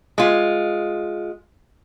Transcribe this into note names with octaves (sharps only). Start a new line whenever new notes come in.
G#3 F4